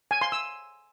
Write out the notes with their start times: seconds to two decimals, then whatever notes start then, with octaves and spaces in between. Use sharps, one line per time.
0.11 G#5
0.21 C6
0.32 E6